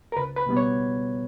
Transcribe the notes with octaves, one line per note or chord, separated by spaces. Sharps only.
A#4
C#2 B4
B4
B2 G3 B3
C#5